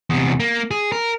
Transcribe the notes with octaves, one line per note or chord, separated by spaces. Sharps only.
E2 C3
A#3
G#4
A#4